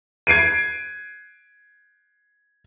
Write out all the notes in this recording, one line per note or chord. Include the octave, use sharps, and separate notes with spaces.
G#6 C7 D7 D#7